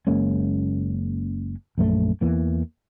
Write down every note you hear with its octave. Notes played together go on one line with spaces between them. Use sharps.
F#1 G#3 A#3 C#4
A#1 F#2 A3
E2 E3 A#3